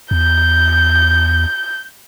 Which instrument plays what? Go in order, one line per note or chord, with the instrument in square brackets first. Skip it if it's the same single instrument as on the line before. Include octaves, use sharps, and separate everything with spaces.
[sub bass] E2 [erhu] G6